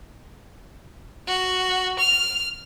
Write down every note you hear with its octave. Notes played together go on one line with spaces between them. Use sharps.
F#4
F6